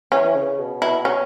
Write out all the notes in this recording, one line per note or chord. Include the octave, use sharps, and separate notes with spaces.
E3 C#4
E3
C#3
B2
B2 E4
C#4